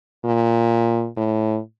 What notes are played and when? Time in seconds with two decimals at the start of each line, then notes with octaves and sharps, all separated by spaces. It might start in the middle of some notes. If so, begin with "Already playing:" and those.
0.25 A#2
1.17 A2